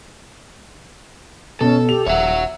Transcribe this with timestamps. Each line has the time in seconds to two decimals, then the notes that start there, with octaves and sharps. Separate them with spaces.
1.61 B2 C#4 A4
1.89 G4 F7
2.06 D#1 C#5 E5 F#5